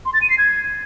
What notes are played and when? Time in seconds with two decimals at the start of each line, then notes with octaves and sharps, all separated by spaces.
0.06 C6
0.14 A6
0.22 D#7
0.30 C7
0.38 G#6